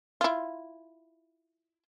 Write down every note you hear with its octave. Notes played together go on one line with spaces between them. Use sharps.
E4 F4